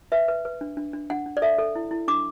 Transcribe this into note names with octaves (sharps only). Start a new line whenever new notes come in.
B4 E5
B4
B4
D4
D4
D4
D4 F#5
D4
D5
A4 E5
A4
E4
E4
D4 D6